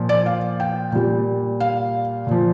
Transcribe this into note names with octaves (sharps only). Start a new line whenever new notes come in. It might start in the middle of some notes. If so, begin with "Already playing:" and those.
Already playing: A#2 F3
D5
F5
G5
A#2 G3
F5
A#2 F3